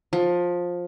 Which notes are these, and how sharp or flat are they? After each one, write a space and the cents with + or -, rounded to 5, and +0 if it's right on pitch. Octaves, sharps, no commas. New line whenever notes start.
F3 +15